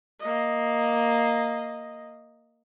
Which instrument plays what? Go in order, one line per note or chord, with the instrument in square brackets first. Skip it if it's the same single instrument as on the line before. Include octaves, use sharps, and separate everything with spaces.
[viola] A#3 D#5